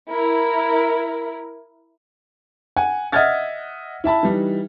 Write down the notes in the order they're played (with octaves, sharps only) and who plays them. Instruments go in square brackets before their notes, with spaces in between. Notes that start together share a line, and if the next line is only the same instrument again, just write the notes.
[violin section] E4 A#4
[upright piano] F#5 G#5
D#5 E5 F#5 F6 G#6 A6
E4 E5 A5 B5
E3 G3 D#4